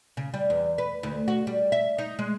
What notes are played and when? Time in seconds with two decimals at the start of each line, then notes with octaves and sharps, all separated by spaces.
0.17 C#3
0.34 G3
0.50 E2
0.78 B4
1.03 D2
1.28 F#4
1.47 G3
1.72 E5
1.98 D#4
2.19 G#3